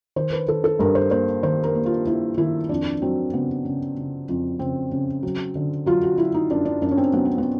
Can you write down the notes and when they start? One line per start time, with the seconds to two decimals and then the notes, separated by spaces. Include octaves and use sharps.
0.16 D#3 C5
0.32 B4
0.48 D#3 A4
0.64 A4
0.79 G2 A#4
0.95 C5
1.11 A#3 C5
1.43 D#3 C5
1.64 A#4
1.75 A#3
1.86 F4
2.07 A#3 E4
2.38 D#3 E4
2.69 F2 D4
3.02 F#3 C4
3.33 C#3 B3
3.65 C#3
3.97 C#3
4.29 F2
4.59 C#3 C4
4.92 C#3
5.23 F#3
5.55 D3
5.86 F#3 F4
6.03 F#4
6.18 F#3 E4
6.34 D#4
6.50 F#2 D4
6.65 D4
6.82 F#2 D4
6.91 C#4
6.98 C4
7.13 F#3 B3
7.25 C4
7.38 B3